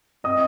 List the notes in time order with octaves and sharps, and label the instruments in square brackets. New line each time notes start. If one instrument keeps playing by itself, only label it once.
[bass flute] C4 [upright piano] D#5 D#6